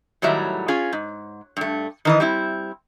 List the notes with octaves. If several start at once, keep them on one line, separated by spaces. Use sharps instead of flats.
A2 D#3 F#3 G3 E5
C#4 F4 G#4
G#2
G2 A3
D#3 E3 D#5
G3 C4 E4